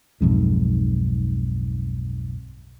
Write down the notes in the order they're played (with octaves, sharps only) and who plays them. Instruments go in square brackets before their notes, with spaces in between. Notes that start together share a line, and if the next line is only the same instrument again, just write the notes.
[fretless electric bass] B1 F2 G#2